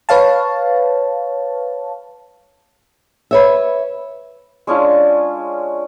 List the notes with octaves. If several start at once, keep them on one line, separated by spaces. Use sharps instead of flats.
B4 C#5 F5 A5
B4 C#5 E5
G#3 C#4 D4 F4